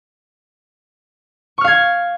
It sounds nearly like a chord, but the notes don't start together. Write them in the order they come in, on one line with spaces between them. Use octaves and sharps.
C#6 F6 F5 G#6